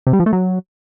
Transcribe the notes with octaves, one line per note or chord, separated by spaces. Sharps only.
C3
G3
F3
A3
F#3